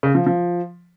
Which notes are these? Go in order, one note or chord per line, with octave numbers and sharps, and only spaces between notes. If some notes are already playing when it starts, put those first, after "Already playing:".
C#3
F3
F3